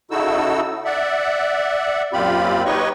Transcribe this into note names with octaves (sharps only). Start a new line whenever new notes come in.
C#3 D#4 E4 F#4 A4 E6
D5 E5 F#5
F#2 A#2 C4 F4 G4 B5
D#4 G4 B4 C#5 D#5 C#6